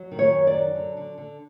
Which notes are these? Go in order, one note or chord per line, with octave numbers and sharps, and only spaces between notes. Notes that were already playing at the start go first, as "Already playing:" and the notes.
Already playing: F#3
D#3
C#5
F#2
D5
F#3
D3
D3
D3